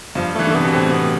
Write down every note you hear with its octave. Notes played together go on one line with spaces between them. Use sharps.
G2 F3
E3 A3
D3 A3
C3 B3
B2
A2 C4
B3